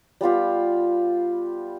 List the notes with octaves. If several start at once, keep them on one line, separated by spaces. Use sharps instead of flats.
G3 B3 F4 G4